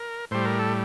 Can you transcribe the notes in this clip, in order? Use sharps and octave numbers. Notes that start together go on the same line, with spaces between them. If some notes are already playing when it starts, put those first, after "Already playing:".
Already playing: A#4
A2 G3 C5
A#4
A4